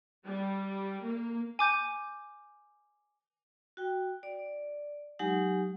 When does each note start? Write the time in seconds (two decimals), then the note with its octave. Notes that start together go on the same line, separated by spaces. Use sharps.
0.25 G3
1.03 A#3
1.59 G#5 D6 G6
3.77 F#4 G5
4.23 D5
5.19 F#3 G#3 D#4 G4 F#5 G#5